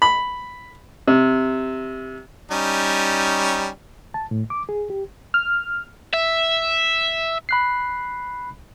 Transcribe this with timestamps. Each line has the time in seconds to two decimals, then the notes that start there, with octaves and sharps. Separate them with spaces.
0.02 B5
1.08 C3
2.51 G3 C#4 D#4
4.14 A5
4.31 A2
4.50 D6
4.69 G#4
4.90 G4
5.34 F6
6.13 E5
7.49 B5 F#6 C7